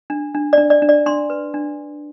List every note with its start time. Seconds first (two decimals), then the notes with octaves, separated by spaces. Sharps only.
0.10 D4
0.35 D4
0.53 D4 D5
0.70 D5
0.82 D4
0.89 D5
1.06 D4 C6
1.30 B4
1.54 D4